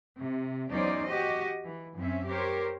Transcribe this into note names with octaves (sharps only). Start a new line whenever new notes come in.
C3
E2 F#3 C#4 D#4 C5 D5
F#4 G4 D#5
E3
F#2 C4 C#4 E5
G4 A#4 C5 C#5